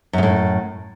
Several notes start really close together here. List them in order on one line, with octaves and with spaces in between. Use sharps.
F#2 C#3 A2